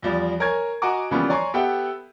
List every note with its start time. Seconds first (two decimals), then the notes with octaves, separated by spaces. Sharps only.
0.02 E2 F3 G3
0.40 A#4 C#5 G#5 G#6
0.82 F#4 D#5 F#5 G#5 A#5 D6
1.11 D#2 C#3 E3 F3 G3 B3
1.29 C#5 D5 G#5 A#5 C6 C#6
1.54 B3 G4 A4 E5 F#5 G5